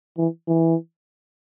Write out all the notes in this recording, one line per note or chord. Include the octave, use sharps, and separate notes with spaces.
E3
E3